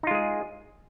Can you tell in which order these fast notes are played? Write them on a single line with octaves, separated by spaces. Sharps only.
D#4 F4 G#3 G#4